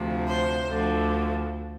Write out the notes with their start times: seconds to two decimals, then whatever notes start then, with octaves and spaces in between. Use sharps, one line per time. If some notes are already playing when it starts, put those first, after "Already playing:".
Already playing: D2 C3 F3
0.28 C5
0.69 D2 D3 F3